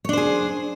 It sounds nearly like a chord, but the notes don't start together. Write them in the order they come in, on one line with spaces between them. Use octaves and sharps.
C#5 D4 C5 G#4